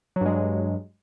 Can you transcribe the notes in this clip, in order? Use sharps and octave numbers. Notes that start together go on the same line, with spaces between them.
G2 F#3 G#3